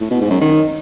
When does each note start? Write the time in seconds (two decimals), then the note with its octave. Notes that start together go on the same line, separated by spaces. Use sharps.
0.01 A2
0.11 B2
0.21 G#2
0.31 F#2
0.41 D#3